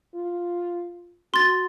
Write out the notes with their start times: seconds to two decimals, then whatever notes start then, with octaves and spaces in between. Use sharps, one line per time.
0.15 F4
1.34 F#4 C6 A6